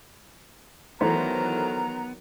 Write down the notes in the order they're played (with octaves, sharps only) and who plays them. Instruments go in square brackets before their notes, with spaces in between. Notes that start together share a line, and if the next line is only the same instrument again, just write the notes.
[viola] D#3 F#3 [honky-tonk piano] E3 A3 C5 [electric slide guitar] B3 [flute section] A#5